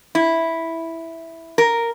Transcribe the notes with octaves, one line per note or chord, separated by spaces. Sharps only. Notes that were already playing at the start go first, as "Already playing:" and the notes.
E4
A#4